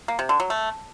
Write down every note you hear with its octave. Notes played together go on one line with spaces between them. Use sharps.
A#3
C3
D3
F#3
A3